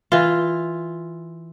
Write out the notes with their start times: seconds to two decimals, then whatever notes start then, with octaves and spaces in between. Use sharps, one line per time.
0.12 E3 F4